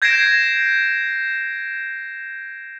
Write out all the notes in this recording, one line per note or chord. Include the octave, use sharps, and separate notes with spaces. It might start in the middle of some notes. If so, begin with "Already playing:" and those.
G6 G#6 A#6 C7 D7 E7